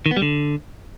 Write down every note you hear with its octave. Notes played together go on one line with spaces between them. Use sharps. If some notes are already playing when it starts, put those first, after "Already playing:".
D#3
B3
G3
D3